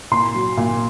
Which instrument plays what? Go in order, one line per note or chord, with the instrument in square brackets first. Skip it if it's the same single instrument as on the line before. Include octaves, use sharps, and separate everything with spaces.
[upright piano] A#2 C6
F#3
A#2